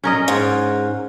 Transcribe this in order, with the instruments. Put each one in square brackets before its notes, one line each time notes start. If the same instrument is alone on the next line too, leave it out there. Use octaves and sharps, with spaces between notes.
[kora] C#4 A#4 D#5
[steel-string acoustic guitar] G#2